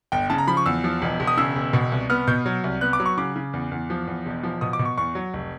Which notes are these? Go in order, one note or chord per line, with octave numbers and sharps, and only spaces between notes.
G1 G5
C#3 A5
A#5
F3 B5
C#6
E2 E6
F3
E1
E1
D#6
C#3 E6
E1
B2
C2
B3 F6
B2 G6
F#3
C2
B3 F#6
D6
F#3
C#6
C#3 D6
C#3
E2
E2
F3
E2
E1
F3
B2 D#6
D6
B2
C#6
E2 C#6
F#3
F1